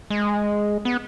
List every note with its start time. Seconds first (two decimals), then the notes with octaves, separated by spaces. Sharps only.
0.10 G#3
0.85 B3